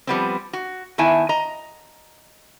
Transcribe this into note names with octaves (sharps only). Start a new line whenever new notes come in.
F3 G3 B3 C4
F#4
D#3 B3 E4 E5 G#5 A5
D#5 A#5